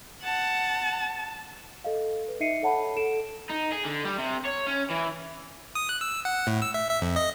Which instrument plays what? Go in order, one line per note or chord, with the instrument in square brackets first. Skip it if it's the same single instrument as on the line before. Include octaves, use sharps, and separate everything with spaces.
[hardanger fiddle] F#5 [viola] A5
[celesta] A4 D#5 F5
B4
D#4 D#5 E5 C7 C#7 D#7
A4 C#5 F#5 A5 B5
A4 D7 E7
[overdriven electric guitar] D#4
G#4
D3
G3
C3
C#5
C#4
E3
[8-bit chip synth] D#6
F#6
E6
F#5
A2
E6
E5
E5
F2
D#5